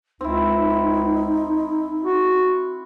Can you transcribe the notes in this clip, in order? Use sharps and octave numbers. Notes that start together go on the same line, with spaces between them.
C#2 C4 D#4 E4
F#4